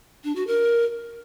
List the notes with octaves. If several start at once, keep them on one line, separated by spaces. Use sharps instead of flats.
D4
F#4
A#4